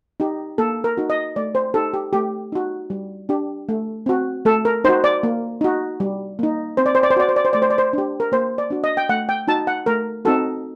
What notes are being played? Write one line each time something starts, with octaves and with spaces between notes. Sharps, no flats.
D#4 G4
A#3 A4
A#4
D#4 F#4
D#5
A3 D5
C5
D#4 G4 A4
G4
A3 G4
D#4 F#4
G3
D4 G4
A3
C4 F#4
A3 A4
A#4
D#4 F#4 C5
D5
A#3
D#4 F#4
G3
A#3 D#4
C4 C5
D5
C5
D5
C5
F#4 D5
C5
D5
C5
A3 D5
C5
D5
C5
D4 G4
A#4
A#3 C5
D5
D4 F#4
D#5
G5
A3 F#5
G5
D#4 F#4 A5
F#5
A3 A#4
C4 D#4 F#4 A4